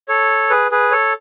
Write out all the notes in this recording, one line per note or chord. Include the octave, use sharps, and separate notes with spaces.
A4 C#5
G#4 B4
G#4 B4
A4 C#5